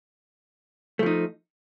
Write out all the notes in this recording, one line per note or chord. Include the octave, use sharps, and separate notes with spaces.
F3 A3 D#4